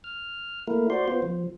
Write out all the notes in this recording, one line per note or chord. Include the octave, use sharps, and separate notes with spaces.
F6
A3 A#3 E4 A#4
F#4 C5 D5 C6
B3 F4 C5
F3